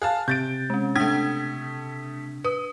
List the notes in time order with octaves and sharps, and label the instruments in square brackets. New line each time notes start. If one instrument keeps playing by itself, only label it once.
[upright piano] G#4 F5 A5 [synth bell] F#6
[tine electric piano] C3 [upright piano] G6 A6 D7
[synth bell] G#3 C#4
[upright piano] A3 G#6 [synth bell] D4 D#6 B6
[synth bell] B4 [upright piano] D#6